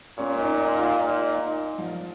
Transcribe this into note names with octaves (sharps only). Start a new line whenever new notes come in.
A#2 C#4 C#5
D#4 D#5
D#4 D#5
F4 F5
A#2 D#4 D#5
D#4 D#5
F3 F4